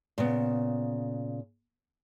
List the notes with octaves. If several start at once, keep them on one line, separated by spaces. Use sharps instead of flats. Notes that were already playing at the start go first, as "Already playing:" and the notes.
A#2 C#3 B3